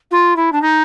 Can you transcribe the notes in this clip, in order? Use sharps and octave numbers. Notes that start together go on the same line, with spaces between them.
F4
E4
D4
D#4